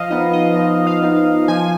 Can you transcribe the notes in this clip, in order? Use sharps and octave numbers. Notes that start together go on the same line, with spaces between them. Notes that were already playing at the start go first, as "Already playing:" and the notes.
Already playing: F3 D#5 F5
B3 D#4 D#5
D#5
F3 D#5
F5
B3 D#4
F3 G#5